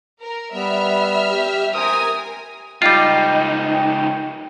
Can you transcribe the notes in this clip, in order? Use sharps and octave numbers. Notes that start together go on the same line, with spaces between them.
A#4
G3 B3 E5 F6
G4
A#4 C5 G#5 D#6
C#2 G3 D#4 F4 G5